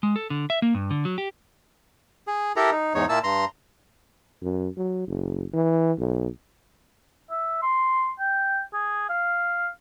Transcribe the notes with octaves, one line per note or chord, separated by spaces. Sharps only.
G#3
A4
D3
E5
A#3
G2
D3
F#3
G4
G#4
E4 G4 A4 A#4 A#5
D#4
E2 G#2 D#4 C#5
A#2 A#3 E4 A5 E6
G2 A#5 C6
F#2
F#3
F#1
E3
B1
E5
C6
G5
G#4
F5